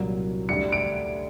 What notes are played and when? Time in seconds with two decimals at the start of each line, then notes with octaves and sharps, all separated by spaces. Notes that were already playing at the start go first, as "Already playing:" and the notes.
Already playing: C2 A#2 F#3
0.49 D2 D3 G3 C#7
0.72 D7